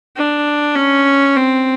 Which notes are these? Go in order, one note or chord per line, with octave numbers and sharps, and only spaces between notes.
D4
C#4
C4